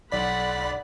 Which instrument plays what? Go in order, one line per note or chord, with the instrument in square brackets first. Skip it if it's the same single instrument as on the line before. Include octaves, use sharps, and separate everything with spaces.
[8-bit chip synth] B1 D5 B6 [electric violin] F#5 B5